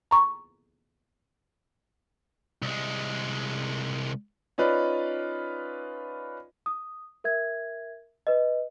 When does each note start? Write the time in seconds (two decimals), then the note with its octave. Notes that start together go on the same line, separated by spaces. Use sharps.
0.11 A#5 C#6
2.62 C2 G#3
4.58 C#4 D#4 F4 B4 D5
6.66 D#6
7.24 A#4 E5 G#6
8.27 B4 D#5